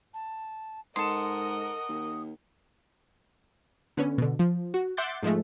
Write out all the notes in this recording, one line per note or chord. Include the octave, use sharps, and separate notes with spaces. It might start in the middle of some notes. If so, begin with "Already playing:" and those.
A5
G#2 A4 A#4 D#5 F#5 C6 D#6
D#2
D3 B3 C#4
B2 D3
F3
F#4
E5 F#5 C6 D6 G6 A6
G#2 F3 G#3 A3